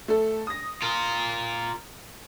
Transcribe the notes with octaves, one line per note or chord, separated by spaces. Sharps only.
A3 A4
D#6 A#6
F4 A#4